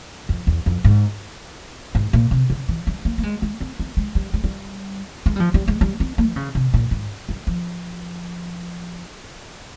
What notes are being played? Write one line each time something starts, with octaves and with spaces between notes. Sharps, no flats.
F2
E2
F2
G#2
G#2
A#2
C3
C#3
E3
G3
A#3
A#3
G#3
G#3
C4
C4
G#3
G3
G#3
G3
G#3
G3
F3
G3
G#3
G3
C4
A#3
E3
C#3
C3
A#2
G#2
G3
F3